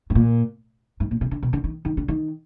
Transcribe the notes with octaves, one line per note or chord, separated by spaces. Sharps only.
G#2
A#2
G#2
A#2
B2
D3
B2
D3
D#3
D#3
D3
D#3